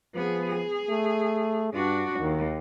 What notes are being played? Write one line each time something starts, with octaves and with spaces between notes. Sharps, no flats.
F3 B3 G#4
G#4
A3
G2 D4 F#4
D#2 D#3